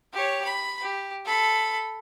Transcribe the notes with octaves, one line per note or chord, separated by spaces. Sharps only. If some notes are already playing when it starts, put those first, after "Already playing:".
G4 C#5
B5
G4
A4 B5